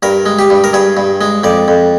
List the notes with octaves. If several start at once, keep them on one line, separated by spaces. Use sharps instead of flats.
G2 A#4
G#3
G4
G2
A#4
G2 G#4
G2
G#3
F2 D5
F2